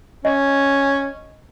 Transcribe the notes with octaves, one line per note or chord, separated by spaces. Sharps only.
C#4 D#5